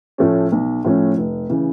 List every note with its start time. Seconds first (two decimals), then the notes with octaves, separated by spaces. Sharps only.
0.18 A2 F3 A3 C#4
0.52 B1
0.85 A2 F3 A3 C#4
1.17 F1
1.50 C#3 E3